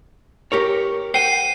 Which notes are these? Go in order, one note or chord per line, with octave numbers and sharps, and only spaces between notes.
G4 A#4 C#5
C5 F#5 G5 C7 D#7